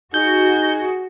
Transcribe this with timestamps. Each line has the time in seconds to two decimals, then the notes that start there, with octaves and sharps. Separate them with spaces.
0.14 D#4 F#4 G#4 G6